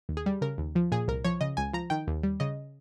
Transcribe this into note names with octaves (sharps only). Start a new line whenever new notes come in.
D#2
G#4
G3
C#3 A#4
D#2
F3
A#2 G#4
C2 A#4
F3 C#5
C#3 D#5
C#2 G#5
F3 A#5
D#3 G5
D#2
G3
C#3 D#5